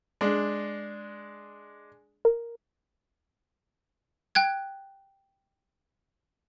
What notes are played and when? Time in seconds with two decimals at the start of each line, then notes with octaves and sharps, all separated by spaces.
0.21 G#3 D4
2.25 A#4
4.35 G5 F#6 G#6